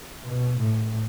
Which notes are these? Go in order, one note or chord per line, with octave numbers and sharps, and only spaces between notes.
B2
A2